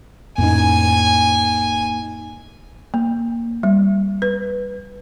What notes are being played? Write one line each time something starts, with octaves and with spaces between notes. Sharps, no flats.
F2 A2 A#3 C#4 D#4 G#5
A#3
G3
B4